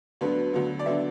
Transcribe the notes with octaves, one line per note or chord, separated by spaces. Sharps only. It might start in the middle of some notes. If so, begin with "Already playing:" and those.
D2 D3 F#3 B3 B4
D2 D3 F#3 B3
D5
D3 F#3 B3 E5